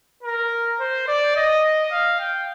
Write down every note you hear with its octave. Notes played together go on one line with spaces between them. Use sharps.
A#4
C5
D5
D#5
F5
G5